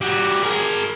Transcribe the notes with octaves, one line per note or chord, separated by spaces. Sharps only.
G3 F#4
G#4 A#4